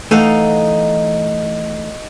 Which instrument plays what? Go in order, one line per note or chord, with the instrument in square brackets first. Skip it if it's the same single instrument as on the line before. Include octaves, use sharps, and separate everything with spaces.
[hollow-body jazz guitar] E3 A3 [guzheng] D#4 F5 F#5